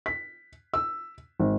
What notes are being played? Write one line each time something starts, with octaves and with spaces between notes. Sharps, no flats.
B6
E6
G#1